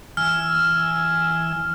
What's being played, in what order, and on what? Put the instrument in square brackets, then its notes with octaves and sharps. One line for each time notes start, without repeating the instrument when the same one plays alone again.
[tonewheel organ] E3 G#5 E6 [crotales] F6